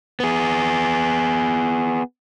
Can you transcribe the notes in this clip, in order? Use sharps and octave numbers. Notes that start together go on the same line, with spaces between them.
B3 G#4